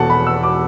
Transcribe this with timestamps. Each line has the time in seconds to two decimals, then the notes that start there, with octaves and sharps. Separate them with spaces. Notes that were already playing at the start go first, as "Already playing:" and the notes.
Already playing: E1 E2 B2 A4 F#5 A5
0.10 B5
0.27 E6
0.43 D6